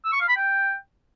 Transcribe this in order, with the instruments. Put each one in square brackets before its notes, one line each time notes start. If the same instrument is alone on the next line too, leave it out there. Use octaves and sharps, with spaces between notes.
[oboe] E6
C#6
F5
B5
G5